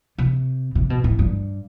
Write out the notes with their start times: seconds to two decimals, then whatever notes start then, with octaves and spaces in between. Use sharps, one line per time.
0.18 C3
0.75 C3
0.90 B2
1.04 A2
1.19 G2